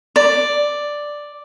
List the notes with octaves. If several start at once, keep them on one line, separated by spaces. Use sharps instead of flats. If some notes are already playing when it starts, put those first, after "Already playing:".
D5